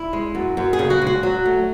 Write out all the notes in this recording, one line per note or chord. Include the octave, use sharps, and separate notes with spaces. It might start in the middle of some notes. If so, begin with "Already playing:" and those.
Already playing: E4
G#3
F#2
F#2
G#4
C#3
F#4
G#3
F#4
F#3
A3